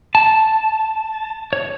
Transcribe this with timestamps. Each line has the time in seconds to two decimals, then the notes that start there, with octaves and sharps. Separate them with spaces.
0.15 A5
1.53 C#5